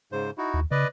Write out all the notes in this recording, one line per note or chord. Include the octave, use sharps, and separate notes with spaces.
G#2 C#3 C5
D#4 E4 F#4
D#2
C#3 B4 D5 D#5